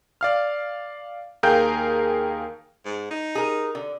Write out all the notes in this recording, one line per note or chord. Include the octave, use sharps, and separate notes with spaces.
D5 F5 F6
D#2 G#4 A#4 F5 G5 G6
G#2
D#4
G#4 A#4
D3